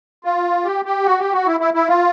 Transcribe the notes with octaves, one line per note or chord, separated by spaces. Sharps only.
F4
G4
G4
F#4
G4
F#4
E4
E4
E4
F4